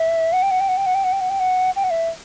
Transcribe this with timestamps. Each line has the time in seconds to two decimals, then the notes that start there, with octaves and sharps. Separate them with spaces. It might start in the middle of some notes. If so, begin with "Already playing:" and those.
Already playing: E5
0.33 F#5
0.42 G5
0.51 F#5
0.60 G5
0.69 F#5
0.77 G5
0.86 F#5
0.94 G5
1.04 F#5
1.12 G5
1.21 F#5
1.30 G5
1.40 F#5
1.76 G5
1.84 F#5
1.90 E5